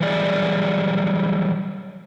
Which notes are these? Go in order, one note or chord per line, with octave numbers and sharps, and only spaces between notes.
E3 F#3 G3 G#4 D5